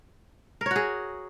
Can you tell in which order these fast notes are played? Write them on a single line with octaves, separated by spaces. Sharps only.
A#4 C#5 F#4 G#4